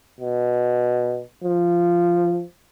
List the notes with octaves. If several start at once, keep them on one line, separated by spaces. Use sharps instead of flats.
B2
F3